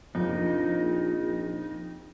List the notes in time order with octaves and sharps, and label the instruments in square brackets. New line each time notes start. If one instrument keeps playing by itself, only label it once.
[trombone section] A#1 [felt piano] F2 [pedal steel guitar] D#4